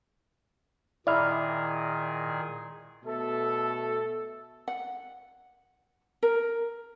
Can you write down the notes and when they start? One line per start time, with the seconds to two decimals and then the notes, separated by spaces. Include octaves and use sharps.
1.07 A#2 D#3 E4 G#4 D5 F6
3.04 B2 A3 A4
4.68 F#5
6.23 A#4